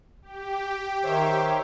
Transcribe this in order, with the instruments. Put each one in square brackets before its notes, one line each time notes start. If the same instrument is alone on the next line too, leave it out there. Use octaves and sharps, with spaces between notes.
[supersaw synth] G4
[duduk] D#3 [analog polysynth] C5 C#5 E5